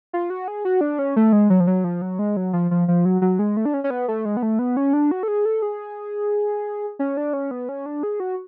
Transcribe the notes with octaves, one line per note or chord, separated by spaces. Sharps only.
F4
F#4
G#4
F#4
D4
C#4
A3
G#3
F#3
F3
F#3
F3
F#3
G#3
F#3
F3
F3
F3
F#3
F#3
G#3
A3
D4
C#4
C#4
B3
A3
G#3
B3
A3
B3
C#4
D4
F#4
A4
G#4
A4
G#4
C#4
D4
C#4
B3
C#4
D4
G#4
F#4